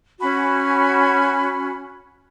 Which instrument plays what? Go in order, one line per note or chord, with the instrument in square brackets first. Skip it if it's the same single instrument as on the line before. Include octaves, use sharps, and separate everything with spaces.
[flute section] C#4 F#4 G#5 B5